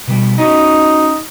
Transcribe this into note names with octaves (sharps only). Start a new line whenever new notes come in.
B2 G3
C#4 D#4 F#4 D#5